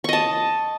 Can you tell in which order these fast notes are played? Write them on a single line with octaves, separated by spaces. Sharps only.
C#6 D#5 A5